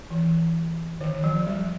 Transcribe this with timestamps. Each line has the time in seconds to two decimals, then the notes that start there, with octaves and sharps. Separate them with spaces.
0.10 E3
1.01 D#3
1.24 F3
1.47 G3